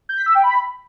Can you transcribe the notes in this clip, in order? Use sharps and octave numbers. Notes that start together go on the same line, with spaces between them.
G6
B6
E6
G5
B5